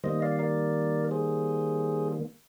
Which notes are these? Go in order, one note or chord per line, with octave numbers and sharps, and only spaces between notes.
D#3 G3 A#3 C5 D#5
D5 F5
A#4 D5
G#4 C5